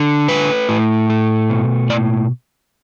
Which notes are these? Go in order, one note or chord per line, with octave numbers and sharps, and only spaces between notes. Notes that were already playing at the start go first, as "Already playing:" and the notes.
Already playing: D3
A3 B4
A2
A3
B2
A2 D5